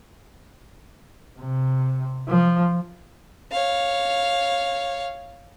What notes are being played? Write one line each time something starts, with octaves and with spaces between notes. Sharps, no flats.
C3
F3
C#5 F5